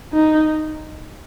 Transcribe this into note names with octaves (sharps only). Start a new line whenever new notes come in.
D#4